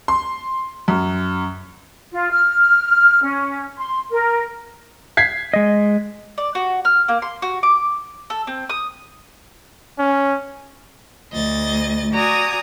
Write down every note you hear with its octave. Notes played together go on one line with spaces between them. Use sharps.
C6
F#2
F4
F6
C#4
C6
A#4
G#6 B6 C7
G#3 D#5
D5
F#4
F6
A#3
C6
F#4
D6
A4
C4
D#6
C#4
D2 D#5 A6
F#4 D5 G#5 A#5 D#6